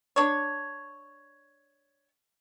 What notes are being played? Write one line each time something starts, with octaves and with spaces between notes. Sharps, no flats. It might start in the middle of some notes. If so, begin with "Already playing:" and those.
D4 C#5